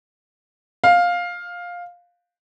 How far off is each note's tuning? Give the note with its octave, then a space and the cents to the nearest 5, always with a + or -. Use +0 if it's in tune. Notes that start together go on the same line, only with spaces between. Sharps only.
F5 +10